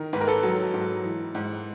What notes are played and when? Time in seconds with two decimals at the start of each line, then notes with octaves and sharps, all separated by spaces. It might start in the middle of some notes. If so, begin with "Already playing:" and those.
Already playing: D#3 A#4
0.13 G#2 B4
0.21 A#4
0.27 A4 B4
0.43 F#3
0.74 G#2
1.04 E3
1.35 G#2